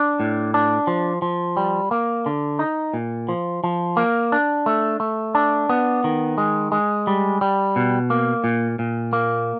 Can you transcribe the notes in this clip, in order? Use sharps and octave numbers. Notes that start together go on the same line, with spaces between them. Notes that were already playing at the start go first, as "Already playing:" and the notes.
Already playing: D4
A2
D4
F3
F3
G3
A#3
D3
D#4
A#2
F3
F3
A#3
D4
A3
A3
D4
B3
D#3
G#3
G#3
G3
G3
B2
A#3
A#2
A#2
A#3